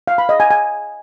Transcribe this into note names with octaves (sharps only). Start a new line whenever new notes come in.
F5
B5
D#5
G#5
G#5